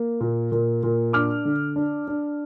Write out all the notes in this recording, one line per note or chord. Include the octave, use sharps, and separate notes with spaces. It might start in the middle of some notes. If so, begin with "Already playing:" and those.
Already playing: A#3
A#2
A#2
A#2
D4 D6 F6
D3
D4
D4